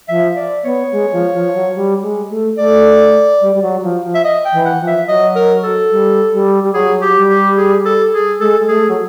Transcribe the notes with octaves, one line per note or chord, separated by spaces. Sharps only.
F3 E5
D5
B3 C#5
G#3
F3
F3
F#3
G3
G#3
A3
A3 D5
G3
G3
F#3
F3
F3
E5
D#5
G5
E3
F#5
F3
E5
F#3 D#5
A#4
A4
G3
G3
G3
F#3 G#4
G4
G3
G4
G#4
A4
G#4
G#3 A4
G#3
A3 G#4
F#3